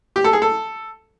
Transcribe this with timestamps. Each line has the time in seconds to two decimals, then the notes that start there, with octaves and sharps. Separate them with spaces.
0.16 G4
0.24 A4
0.33 G#4
0.42 A4